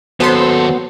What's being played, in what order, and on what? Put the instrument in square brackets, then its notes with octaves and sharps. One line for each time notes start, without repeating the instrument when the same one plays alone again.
[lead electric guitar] D#2 A4 [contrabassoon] F#3 [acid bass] B3 [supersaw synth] C5 C6